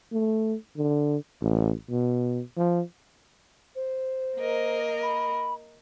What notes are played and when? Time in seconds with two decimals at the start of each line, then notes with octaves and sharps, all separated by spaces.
0.13 A3
0.77 D3
1.41 A1
1.90 B2
2.57 F3
3.75 C5
4.37 A#3 A#4 D#5
5.02 B5